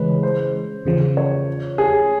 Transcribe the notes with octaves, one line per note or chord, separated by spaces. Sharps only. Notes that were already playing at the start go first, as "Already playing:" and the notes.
Already playing: C#3 E3 G#3 C#4 B4
C5
E2 C#3 F3
C#5
G#4